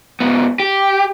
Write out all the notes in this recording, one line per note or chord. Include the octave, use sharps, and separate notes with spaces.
G#2 B3
G4